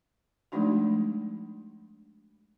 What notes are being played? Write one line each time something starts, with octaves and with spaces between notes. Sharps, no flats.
F3 G#3 A3 D4 D#4 F#4